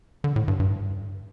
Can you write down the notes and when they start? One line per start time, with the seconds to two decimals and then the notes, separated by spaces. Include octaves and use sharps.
0.24 D3
0.36 A2
0.48 G2
0.60 G2